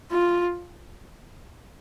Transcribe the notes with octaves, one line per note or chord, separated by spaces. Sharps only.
F4